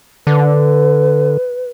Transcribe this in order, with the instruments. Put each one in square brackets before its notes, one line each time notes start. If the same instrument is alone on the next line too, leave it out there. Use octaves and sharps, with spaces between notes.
[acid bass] D3 [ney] B4